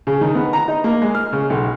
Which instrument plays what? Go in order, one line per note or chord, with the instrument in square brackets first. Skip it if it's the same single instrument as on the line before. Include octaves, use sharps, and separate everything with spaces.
[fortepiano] C#3
D#3
B3
A#5
D#4
A#3
G#3
F6
C#3
B1